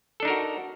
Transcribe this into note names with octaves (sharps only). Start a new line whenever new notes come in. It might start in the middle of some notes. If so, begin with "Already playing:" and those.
D4 D#4 F#4 A4 A#4